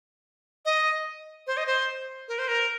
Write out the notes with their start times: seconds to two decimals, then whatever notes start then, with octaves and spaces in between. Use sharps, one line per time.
0.65 D#5
1.47 C5
1.57 D#5
1.67 C5
2.28 A#4
2.39 C5
2.48 A#4